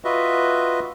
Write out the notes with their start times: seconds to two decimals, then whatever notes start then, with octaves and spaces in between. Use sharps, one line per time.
0.05 F4 F#4 B4 D#5 E5